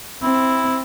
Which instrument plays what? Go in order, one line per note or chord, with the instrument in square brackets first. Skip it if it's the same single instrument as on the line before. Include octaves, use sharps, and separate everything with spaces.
[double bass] C4 [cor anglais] E4